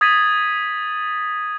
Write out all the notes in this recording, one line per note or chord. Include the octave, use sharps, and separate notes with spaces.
D#6 G#6 A6 B6 D#7 F#7